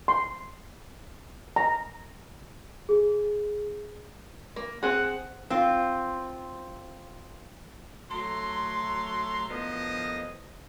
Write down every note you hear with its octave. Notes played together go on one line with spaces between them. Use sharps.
C6
A#5
G#4
A#3
C4 G#4 F#5
C4 F4
F#3 A3 A#5 C6
A2 D3 F3 B3 A#4 D#5